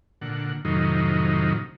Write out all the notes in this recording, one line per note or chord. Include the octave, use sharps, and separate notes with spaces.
A#2 D3 F#5
F2 A2 C3 D#3 F#3 D#4